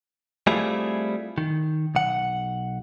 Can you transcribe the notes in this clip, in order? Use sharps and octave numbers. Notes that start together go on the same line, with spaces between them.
G3 A3 C4 E4 F4 G#4
D#3
B1 F#5